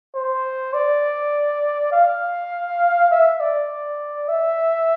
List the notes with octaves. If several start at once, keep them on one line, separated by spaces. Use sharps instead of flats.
C5
D5
F5
E5
D5
E5